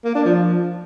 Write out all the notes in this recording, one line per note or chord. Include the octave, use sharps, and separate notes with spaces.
A#3
D4
F3